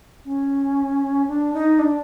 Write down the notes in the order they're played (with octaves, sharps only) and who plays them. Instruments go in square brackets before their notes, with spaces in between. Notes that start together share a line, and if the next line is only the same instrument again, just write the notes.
[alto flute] C#4
D4
D#4
D4